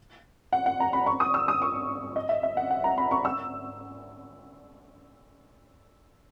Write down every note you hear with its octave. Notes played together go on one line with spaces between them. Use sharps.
F#5
F#5
A#5
B5
C#6
D#6
E6
D#6
C#6
D#5
E5
E5
F#5
F#5
A#5
B5
C#6
E6